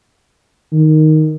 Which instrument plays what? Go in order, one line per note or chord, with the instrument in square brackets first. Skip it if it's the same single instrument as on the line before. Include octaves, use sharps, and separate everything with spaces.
[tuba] D#3